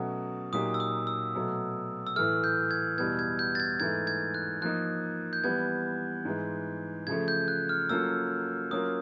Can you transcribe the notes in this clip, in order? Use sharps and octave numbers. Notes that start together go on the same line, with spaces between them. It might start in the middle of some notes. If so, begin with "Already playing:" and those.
Already playing: B2 F#3 A3 C#4 F#4 D#6
A#2 F#3 A#3 D#4 G4 D#6
E6
D#6
E6
B2 F#3 A3
E6
A2 E3 A3 F6
G6
G#6
E2 B2 G3 B3 G#6
G#6
G6
A6
G#6
G#2 E3 A3 G#6
G#6
F#6
F3 A#3 D#4 F#6
G6
E3 G3 B3 G#6
G#2 E3 G#3
C#3 F3 A3 G#6
G6
F#6
F6
F#3 A#3 C#4 F4 A4 E6
F#3 A#3 C#4 F4 A#4 D#6